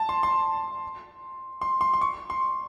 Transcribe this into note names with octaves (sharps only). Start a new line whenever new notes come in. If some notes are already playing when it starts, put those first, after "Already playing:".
Already playing: A5
C6
C6
C6
C6
C6
C#6
C6